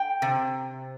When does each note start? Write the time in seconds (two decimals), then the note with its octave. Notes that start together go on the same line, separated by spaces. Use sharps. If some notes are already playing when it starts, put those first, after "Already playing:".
Already playing: G5
0.22 C3